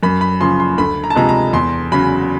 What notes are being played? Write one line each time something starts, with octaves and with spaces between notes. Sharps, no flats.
F#2 B5
B5
C#3 F3 C6
C6
D2 B5
A#5
A5
C3 F3 G#3 A#5
A#5
E2 C6
C#3 F#3 B5